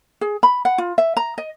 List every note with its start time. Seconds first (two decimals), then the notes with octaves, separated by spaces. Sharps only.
0.21 G#4
0.43 B5
0.65 F#5
0.78 F4
0.98 E5
1.17 A#5
1.38 D#5